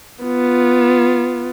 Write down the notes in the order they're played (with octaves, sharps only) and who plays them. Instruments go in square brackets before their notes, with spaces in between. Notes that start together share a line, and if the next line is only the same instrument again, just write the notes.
[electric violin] B3 F4